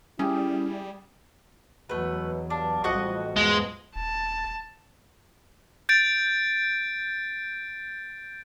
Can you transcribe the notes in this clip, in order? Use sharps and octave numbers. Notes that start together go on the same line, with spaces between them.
G3 C#4 E4 G4 G#4
E2 B2 F#3 A3 B4
G2 D4 F5 D6
A1 F2 G3 F#4 D#5 F#5
E2 G#2 F3 G#3 B3
D#1 A5
G6 A6 D7